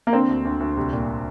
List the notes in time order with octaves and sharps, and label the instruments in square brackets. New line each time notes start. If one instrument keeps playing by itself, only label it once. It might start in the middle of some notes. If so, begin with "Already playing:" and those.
[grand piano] A#3
D3 C4
D2
D2
D2
C2
A#2